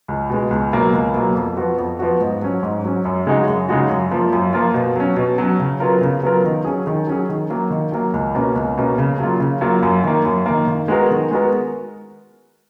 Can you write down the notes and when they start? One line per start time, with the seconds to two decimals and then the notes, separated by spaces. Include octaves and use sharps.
0.08 C#2
0.30 B2 G#3
0.51 C#2
0.72 B2 F#3 A#3
0.93 C#2
1.14 B2 F#3 A#3
1.35 F2
1.57 F3 B3 F#4
1.78 F2
1.99 F3 B3 F#4
2.20 G#2
2.42 F#3 C#4
2.63 G#2
2.84 F#3 C#4
3.05 F#2
3.26 C#3 G#3 D#4 F#4
3.47 F#2
3.69 C#3 G#3 D#4 F#4
3.89 F#2
4.11 F3 A#3 F4
4.33 F#2
4.53 F3 A#3 F4
4.74 B2
4.96 F#3 C#4
5.16 B2
5.38 F#3 C#4
5.60 C#3
5.80 F#3 B3 F4 A#4
6.01 C#3
6.23 F#3 B3 F4 A#4
6.44 D#3
6.65 F#3 C#4 G#4
6.87 D#3
7.07 F#3 C#4 G#4
7.29 D#3
7.50 F#3 A#3
7.70 D#3
7.92 F#3 A#3
8.14 C#2
8.35 B2 A#3 C#4
8.56 C#2
8.77 B2 A#3 C#4
8.98 C#3
9.19 F#3 A#3 F4
9.40 C#3
9.61 F#3 A#3 F4
9.83 F#2
10.04 D#3 A#3
10.25 F#2
10.46 D#3 A#3
10.68 D#3
10.88 G#3 B3 F#4 A#4
11.10 D#3
11.31 G#3 B3 F#4 A#4